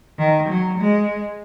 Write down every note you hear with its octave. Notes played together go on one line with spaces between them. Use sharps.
D#3
F#3
G#3